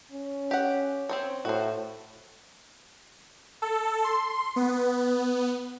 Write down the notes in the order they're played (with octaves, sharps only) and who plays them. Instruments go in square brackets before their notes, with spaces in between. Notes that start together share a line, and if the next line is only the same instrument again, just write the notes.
[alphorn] C#4
[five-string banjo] G4 F#5
C4 C5 C#5
[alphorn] A2 [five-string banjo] F#4 C5
[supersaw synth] A4
C6
B3